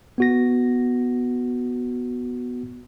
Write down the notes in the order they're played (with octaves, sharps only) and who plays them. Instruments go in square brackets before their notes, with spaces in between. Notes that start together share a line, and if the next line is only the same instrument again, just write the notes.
[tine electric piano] B3 F#4 A#6